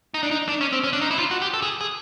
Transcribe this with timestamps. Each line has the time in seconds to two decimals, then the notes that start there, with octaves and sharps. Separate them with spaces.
0.14 D#4
0.23 D4
0.31 D#4
0.48 D4
0.61 C#4
0.72 C4
0.84 C#4
0.93 D4
1.01 D#4
1.11 E4
1.19 F4
1.31 F#4
1.42 G4
1.54 A4
1.62 G#4
1.81 G#4